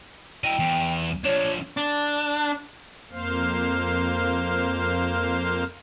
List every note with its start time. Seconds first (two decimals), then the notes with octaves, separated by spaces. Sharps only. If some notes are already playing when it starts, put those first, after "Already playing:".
0.44 E4 D#5 G5
0.59 E2
1.24 F3 D4 C#5
1.77 D4
3.11 F2 A#3 C5 F5